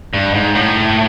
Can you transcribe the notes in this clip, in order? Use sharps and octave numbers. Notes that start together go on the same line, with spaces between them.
G2
G#2
A2